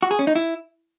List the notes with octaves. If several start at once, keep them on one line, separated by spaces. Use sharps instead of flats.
F#4
G#4
C#4
D#4
E4